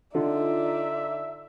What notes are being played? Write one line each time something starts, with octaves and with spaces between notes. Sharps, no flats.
D3 D#4 F4 D5 E5